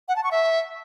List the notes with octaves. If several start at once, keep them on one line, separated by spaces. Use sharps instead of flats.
F#5
A5
C#6
E5